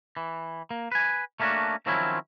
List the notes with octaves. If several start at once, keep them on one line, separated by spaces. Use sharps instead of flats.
E3
A#3
B4 G#5
A3 A#3 C#4 D4 F#4
D#3 F3 F#3 C4 C#4 E4